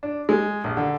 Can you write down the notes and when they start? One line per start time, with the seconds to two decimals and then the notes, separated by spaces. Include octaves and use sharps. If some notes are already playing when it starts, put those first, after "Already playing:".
0.03 D4
0.29 G#3
0.64 A#1
0.77 D3